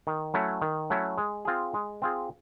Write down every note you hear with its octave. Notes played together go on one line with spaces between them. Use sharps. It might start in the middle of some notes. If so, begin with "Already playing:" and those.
D#3
F#3 A3 C#4 E4
D#3
F#3 A3 C#4 E4
G#3
C4 F4 G#4
G#3
C4 F4 G#4